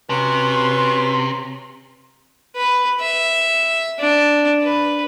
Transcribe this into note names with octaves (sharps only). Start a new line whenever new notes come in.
C3 C#4 F#4 B4
B4
E5
D4
B4